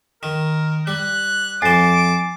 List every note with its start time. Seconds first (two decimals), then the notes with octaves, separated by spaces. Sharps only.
0.23 D#3 A#4
0.87 G3 F#6
1.62 F2 C5 G#5 D6 A6 C7